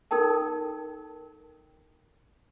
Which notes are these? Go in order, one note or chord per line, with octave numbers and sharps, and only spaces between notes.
D#4 A4 A#4 G5 A5